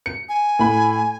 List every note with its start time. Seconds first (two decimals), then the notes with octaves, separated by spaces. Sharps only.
0.06 C#7
0.29 G#5
0.59 A2 B5